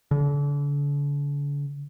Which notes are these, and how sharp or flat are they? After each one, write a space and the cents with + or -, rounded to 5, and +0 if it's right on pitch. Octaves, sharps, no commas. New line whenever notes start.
D3 -40